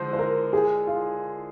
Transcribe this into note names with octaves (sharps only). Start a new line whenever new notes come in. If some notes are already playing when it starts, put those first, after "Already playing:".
Already playing: D3 F3 G#3 C5
C5
A#4
G#4
F4